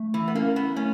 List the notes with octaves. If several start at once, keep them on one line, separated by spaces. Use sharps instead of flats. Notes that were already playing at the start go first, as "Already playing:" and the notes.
Already playing: A3
E3
B3
A#3 C#4 E4
B3
A3 C#4